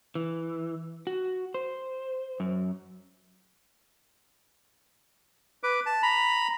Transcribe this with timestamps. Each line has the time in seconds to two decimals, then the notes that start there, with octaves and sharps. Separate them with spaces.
0.15 E3
1.07 F#4
1.54 C5
2.40 F#2
5.63 B4 D6
5.86 A5
6.03 A#5 B5